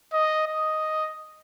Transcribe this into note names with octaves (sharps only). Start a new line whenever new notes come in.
D#5
D#5